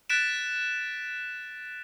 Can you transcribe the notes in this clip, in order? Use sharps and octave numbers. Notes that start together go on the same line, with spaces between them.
F#6 A6 B6 D7 E7